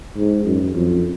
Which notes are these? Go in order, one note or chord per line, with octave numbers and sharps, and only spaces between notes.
G#2
F#2
F2